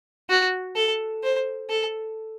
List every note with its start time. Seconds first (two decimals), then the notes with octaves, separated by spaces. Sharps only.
0.30 F#4
0.76 A4
1.23 C5
1.70 A4